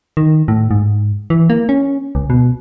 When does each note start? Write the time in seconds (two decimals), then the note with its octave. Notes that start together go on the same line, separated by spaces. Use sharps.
0.17 D#3
0.48 A2
0.71 G#2
1.30 E3
1.50 A#3
1.69 C#4
2.15 C#2
2.30 B2